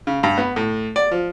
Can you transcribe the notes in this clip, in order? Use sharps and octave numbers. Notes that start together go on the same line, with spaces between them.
C#3
G2
B3
A2
D5
F3